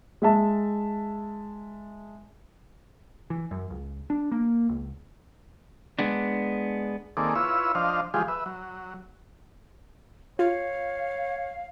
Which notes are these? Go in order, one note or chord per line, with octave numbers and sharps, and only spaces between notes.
G#3 E5 A5
E3
F#2
C#2
D4
A#3
C#2
G#3 B3 D4
D#3 A#3 C4 G#4 A4 D5
E4 F4 B4 C#5 E6
F3 D4 C5 D#5 F5
E3 F3 G#3 F4 G4 G#4
B4 E5
F#3
F4 C#5 F5